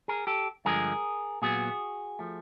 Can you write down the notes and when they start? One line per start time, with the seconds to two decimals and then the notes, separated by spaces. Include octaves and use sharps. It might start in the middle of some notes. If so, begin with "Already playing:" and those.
0.08 G#4 A#4
0.27 G4 A4
0.65 G2 D3 F3 G#3 G#4 A#4
1.42 A#2 F#3 B3 F#4 G#4
2.19 F3 A3